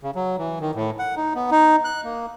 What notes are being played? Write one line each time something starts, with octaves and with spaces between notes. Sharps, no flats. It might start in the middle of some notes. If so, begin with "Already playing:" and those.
C#3
F#3
E3
D#3
A2
F#5
D#4
B3
D#4
F#6
A#3